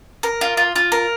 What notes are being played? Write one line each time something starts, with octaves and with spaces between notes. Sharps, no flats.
A#4
F4
F4
F4
A#4